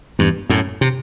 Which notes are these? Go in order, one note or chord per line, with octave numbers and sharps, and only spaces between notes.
E2 G2
F#2 A2
C3